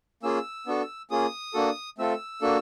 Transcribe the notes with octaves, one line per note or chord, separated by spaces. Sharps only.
A#3 C#4 F4 G#4 E6
B3 D4 F#4 A4
A#3 C#4 F4 G#4 D#6
A#3 D4 F#4 A4
A3 C4 F4 A4 E6
A#3 D4 F#4 A4